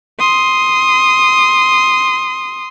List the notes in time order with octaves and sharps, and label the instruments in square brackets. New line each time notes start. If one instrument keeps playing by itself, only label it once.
[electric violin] C6 D#6